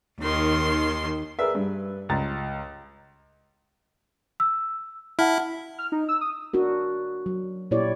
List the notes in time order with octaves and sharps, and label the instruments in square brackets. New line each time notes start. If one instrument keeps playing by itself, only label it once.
[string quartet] D#2 D#3 C6
[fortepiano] G#4 A#4 E5 [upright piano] B4 D5
[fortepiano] G2
[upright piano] C#2 A#5 A6
[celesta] E6
[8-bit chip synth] E4 [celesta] F#5 A5 F6
[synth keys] F6
D#4
E6
D#6
[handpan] D4 F#4 A#4
F#3
A#2 E4 G4 C#5 D5